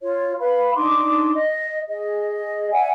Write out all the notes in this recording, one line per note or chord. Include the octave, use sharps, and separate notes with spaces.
F4 C#5
B4 F5 B5
D4 D#4 C6 D6
D#5
G#4 D#5
D5 E5 F#5 G#5